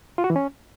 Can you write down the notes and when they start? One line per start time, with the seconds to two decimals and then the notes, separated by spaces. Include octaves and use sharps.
0.18 F4
0.24 F#4
0.30 E3
0.36 C#4